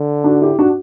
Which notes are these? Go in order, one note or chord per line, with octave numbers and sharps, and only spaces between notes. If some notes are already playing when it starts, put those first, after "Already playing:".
Already playing: D3
D4 F#4
E4 G4
D4 F#4